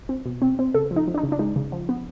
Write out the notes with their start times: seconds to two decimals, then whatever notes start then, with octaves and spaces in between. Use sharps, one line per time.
0.09 C4
0.25 B2
0.42 C4
0.59 C4
0.74 C#3 A4
0.91 F3
0.96 D#4
1.08 F3
1.14 D4
1.18 D#4
1.23 C#3
1.32 D4
1.39 G#3 D#4
1.56 C#3
1.72 F3
1.89 B3